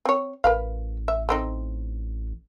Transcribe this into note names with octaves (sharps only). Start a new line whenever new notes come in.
C4 C#5
A1 A#4 B4 F5
E5
A3 C4 D#4